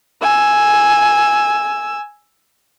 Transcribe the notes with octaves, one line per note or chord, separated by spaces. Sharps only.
G#5 E6